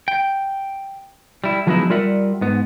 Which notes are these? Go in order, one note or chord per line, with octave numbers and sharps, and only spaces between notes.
G5
G3 E4
F3 F#3 G#3 B3 D#4 E4
G3 F4 A#4 D5 E5 F#5
G#2 B3